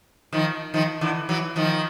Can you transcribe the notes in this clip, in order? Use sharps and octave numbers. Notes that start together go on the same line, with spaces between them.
D#3 F3
D#3 F3
D3 E3
E3 F#3
D#3 F3